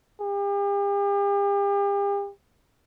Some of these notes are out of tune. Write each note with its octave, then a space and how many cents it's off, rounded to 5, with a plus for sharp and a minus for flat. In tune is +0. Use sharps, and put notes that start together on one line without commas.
G4 +40